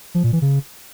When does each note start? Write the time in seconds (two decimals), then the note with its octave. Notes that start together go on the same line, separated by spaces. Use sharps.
0.15 F3
0.24 A#2
0.33 E3
0.42 C#3